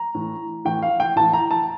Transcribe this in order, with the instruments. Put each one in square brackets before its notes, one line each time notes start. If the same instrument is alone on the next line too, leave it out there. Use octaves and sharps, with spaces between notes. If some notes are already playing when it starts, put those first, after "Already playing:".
Already playing: [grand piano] A#5
A2 E3
A2 E3 G5
F5
G5
A2 E3 A5
A#5
A5